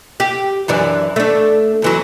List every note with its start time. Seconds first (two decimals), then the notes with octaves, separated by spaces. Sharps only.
0.20 G4
0.68 F#2 E3 D4
1.16 A3 D4
1.82 E2 E3 F#3